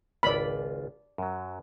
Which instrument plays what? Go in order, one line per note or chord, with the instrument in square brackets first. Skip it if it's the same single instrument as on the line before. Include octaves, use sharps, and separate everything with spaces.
[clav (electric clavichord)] G#1 C#2 F4 [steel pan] D5 B5
[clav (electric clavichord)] F#2 F#3